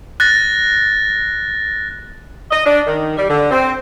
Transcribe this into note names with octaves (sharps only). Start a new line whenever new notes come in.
F#6 A6 A#6
D#5
D4
D#3
G3
D3
C4